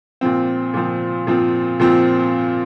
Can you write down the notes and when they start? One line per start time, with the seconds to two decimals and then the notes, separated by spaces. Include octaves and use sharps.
0.21 A#2 F3 C4
0.74 A#2 F3 C4
1.27 A#2 F3 C4
1.80 A#2 F3 C4